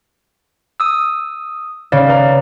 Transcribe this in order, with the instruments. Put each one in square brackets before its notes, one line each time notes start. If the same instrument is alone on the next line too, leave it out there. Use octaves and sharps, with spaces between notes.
[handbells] D#6 E6
[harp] C#3 [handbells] D5 F5
[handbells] B4 D5 A#5